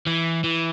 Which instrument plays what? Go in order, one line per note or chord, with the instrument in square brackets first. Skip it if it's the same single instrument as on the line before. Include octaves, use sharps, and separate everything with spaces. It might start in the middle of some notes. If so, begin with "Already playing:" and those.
[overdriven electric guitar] E3
E3